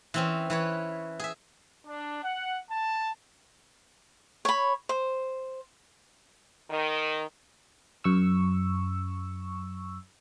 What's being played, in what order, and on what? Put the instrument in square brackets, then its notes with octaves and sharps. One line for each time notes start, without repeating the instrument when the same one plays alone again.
[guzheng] E3 C4 C#4
E3 B4 C#5
G#4 E5
[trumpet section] D4
F#5
A5
[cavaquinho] C#5 B5
C5
[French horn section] D#3
[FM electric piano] F#2 C#6 E6